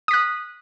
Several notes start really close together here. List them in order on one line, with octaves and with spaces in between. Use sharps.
D#6 B6 F#6